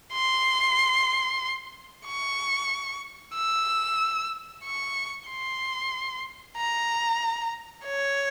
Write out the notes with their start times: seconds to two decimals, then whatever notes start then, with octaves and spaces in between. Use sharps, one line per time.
0.13 C6
2.06 C#6
3.35 E6
4.64 C#6
5.28 C6
6.57 A#5
7.86 C#5